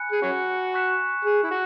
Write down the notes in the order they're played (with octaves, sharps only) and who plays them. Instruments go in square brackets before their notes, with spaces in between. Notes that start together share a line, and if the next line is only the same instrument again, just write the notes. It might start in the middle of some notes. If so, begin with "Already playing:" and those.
Already playing: [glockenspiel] G#5 B5 F#6 C#7
[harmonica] G#4
C#4 F#4
[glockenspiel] C#6 F#6 B6 E7
[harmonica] G#4
E4
F#4